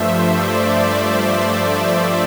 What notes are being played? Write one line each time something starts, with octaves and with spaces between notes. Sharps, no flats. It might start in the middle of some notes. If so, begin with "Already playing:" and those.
Already playing: G2 F3 A3 C5 E5
D5
C5
C5